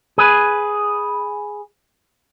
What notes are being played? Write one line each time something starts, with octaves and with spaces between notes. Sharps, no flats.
G#4 B4